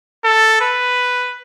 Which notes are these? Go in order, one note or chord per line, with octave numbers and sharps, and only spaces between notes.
A4
B4